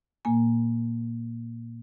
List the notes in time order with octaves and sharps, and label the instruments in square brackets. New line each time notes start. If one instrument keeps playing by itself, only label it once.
[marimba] A#2 A#3 G#5